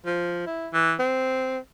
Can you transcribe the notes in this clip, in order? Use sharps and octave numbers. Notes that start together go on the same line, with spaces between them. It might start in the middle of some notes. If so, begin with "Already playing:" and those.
F3
E4
E3
C4